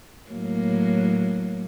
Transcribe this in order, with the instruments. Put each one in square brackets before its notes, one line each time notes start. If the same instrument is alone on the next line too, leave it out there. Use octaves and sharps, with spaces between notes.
[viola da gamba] A2 F#3 A#3